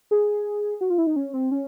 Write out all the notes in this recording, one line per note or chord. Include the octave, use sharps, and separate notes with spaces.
G#4
F#4
F4
E4
D#4
C#4
C4
C#4